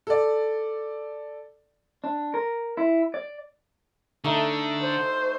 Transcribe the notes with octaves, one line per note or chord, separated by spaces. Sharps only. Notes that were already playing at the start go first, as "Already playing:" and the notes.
A4 D5
D4
A#4
E4
D5
D3 A3 D#4 D#5
C5